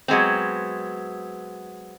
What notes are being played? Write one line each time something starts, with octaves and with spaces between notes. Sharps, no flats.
F#3 G#3 B3 C4